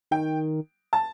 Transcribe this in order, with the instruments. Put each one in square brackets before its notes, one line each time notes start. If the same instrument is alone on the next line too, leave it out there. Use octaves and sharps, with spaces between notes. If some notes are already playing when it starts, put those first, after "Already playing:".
[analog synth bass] D#3 [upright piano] G5
[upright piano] A5